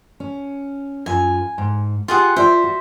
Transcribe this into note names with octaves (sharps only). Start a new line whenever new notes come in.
C#4
F#2 F4 G#5
G#2
F4 G4 G#4 F#5
F4 C5 D5 E5
F#4